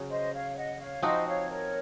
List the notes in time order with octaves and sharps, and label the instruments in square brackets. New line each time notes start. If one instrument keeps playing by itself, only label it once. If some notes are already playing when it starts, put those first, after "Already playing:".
Already playing: [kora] C#3 F#3 C#4
[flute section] C5 D#5
C#5 F5
D#5 F#5
C#5 F5
[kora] F3 C4 D#4 F#4 [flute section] C5 D#5
[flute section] C#5 F5
A#4 C#5